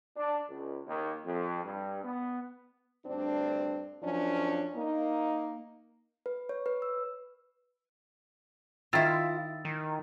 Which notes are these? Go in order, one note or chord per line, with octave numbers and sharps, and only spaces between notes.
D4
C#2
D#2
F2
G2
B3
D2 G2 C4 D4
F#2 F3 C#4 D4
A#3 D#4
B4
C#5
B4
E6
D#3 E4 F4 E6 A6
D#3